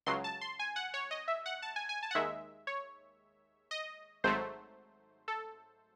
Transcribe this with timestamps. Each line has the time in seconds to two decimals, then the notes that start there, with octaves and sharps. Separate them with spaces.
0.06 C#2 C#3 F#3 C6
0.24 A5
0.41 C6
0.59 G#5
0.76 F#5
0.94 C#5
1.11 D#5
1.28 E5
1.46 F#5
1.62 A5
1.76 G#5
1.89 G#5
2.03 A5
2.11 F#5
2.15 D#2 D#3 G#3 E5
2.67 C#5
3.71 D#5
4.24 G#1 G#2 F#3 A3 C5
5.28 A4